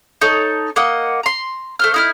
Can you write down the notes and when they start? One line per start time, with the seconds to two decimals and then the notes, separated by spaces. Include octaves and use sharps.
0.21 D#4 A4 C#5
0.76 A#3 D#5 F#5
1.23 A#5 C6
1.79 A3 C5 F6
1.94 D#4 E4 F6